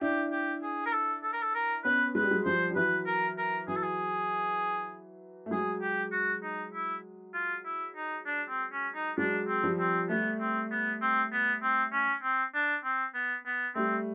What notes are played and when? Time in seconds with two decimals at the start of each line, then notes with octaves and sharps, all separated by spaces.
0.01 D4 E4 G4
0.31 G4
0.63 G#4
0.86 A#4
0.93 A4
1.23 A4
1.33 A#4
1.42 A4
1.55 A#4
1.84 B3 C#4 B4
2.15 G#3 B4
2.23 G3
2.31 F#3 G#3
2.45 F3 G3 C5
2.70 G3
2.76 E3 F#3 B4
3.06 A#4
3.38 A#4
3.68 E3 F#3 G#4
3.76 A4
3.82 G#4
5.46 A3
5.51 F#3 G#3 G#4
5.81 G4
6.12 F#4
6.43 D#4
6.74 E4
7.34 F4
7.65 E4
7.96 D#4
8.26 D4
8.48 C4
8.72 C#4
8.95 D#4
9.18 F#3 G#3 D4
9.48 C4
9.64 F3 G3
9.79 C4
10.09 G3 A3 B3
10.40 C4
10.71 B3
11.01 C4
11.32 B3
11.63 C4
11.92 C#4
12.23 C4
12.54 D4
12.84 C4
13.14 B3
13.46 B3
13.75 G3 A3 C4